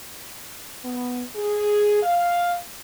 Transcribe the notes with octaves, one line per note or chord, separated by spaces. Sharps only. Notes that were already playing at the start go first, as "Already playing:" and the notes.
B3
G#4
F5